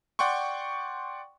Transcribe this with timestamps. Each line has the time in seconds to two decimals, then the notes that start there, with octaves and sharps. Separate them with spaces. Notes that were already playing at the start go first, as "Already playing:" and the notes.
0.19 D5 F#5 G5 C6 C#6